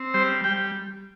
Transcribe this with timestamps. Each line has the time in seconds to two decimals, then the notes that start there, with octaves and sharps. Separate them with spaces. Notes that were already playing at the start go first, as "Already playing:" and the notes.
Already playing: C4
0.14 G3 C5
0.44 G3 G5